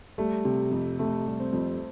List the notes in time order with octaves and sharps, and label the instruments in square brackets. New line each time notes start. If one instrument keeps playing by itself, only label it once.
[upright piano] G3 [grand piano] A3
[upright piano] C3
F2
[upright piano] C3 [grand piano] A3
[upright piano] G3
[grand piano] C4
[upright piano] F2